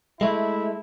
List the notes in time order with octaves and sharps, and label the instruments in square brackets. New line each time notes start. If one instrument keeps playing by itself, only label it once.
[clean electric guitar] G#3 A3 [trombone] E4